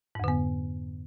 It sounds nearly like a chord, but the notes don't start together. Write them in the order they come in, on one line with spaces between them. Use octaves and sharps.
G#2 F2 D3 B3